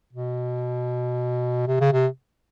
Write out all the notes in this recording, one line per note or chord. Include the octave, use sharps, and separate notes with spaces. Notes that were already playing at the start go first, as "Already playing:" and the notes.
B2
C3
C#3
C3